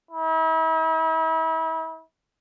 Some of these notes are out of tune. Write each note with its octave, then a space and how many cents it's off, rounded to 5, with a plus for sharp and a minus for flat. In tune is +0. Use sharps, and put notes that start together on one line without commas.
E4 -40